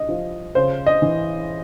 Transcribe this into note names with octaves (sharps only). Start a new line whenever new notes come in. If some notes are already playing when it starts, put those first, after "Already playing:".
Already playing: C2 D#5
F3
C#3 C5
D#5
E3